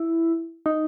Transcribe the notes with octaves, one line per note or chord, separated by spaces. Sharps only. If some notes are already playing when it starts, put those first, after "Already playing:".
Already playing: E4
D#4